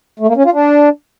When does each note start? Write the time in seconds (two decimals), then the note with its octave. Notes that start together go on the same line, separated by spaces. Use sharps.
0.19 A3
0.28 A#3
0.36 C#4
0.45 F4
0.53 D4